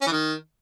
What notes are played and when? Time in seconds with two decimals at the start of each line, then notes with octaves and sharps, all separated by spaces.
0.01 C#4
0.07 E3
0.12 D#3